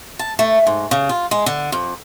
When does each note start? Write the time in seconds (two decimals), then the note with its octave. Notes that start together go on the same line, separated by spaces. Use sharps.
0.19 A5
0.39 A3
0.67 G#2
0.91 C#3
1.09 F4
1.31 G#3
1.46 D3
1.72 F2